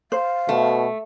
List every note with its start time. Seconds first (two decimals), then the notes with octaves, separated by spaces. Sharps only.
0.12 C5 F5
0.49 B2 A3